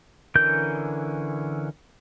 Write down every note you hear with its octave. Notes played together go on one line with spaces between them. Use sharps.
D3 E3 C#4 A#4 G6